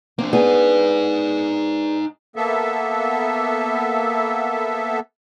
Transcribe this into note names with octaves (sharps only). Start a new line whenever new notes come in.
A#3 C4 D4
B3 D4 D#4 G#4 G#5
A#3 B3 A4 E5